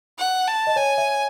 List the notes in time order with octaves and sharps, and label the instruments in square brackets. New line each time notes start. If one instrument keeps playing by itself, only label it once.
[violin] F#5
A5
[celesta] D#5
[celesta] C#5 [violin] G#5
[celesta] E5